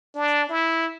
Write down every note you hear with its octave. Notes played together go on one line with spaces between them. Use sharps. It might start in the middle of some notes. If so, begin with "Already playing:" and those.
D4
E4